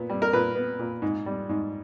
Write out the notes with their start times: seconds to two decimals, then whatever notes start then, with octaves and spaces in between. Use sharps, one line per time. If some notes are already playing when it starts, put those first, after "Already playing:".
Already playing: A#2 B3
0.09 G3
0.22 A#4
0.33 A#2 B4
0.55 B3
0.79 A#2
1.02 G#2
1.26 G3
1.49 G#2